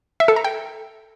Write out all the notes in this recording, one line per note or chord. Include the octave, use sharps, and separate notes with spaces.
E5
A4
A#5
G5